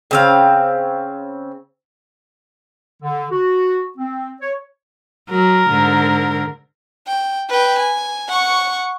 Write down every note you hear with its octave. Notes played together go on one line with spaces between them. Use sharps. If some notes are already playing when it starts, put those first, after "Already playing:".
C#3 C4 F5
D3
F#4
C4
C#5
F#3 A#4
G#2 D3
G5
B4 G5
G#5
F#5 C#6